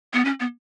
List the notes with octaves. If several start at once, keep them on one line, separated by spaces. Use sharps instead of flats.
B3
C#4
B3